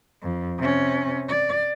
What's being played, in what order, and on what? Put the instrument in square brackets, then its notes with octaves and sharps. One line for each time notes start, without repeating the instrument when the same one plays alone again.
[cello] F2
C3 C#4
D5